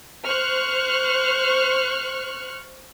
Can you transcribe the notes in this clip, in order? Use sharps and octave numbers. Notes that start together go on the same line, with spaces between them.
C5 C#6 F6 F#6